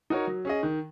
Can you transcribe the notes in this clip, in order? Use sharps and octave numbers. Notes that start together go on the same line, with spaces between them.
D#4 F#4 A#4 C#5
F#3
C#4 G#4 D#5
D#3